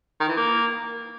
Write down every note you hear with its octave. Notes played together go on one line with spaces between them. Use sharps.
D#3
E3
A#3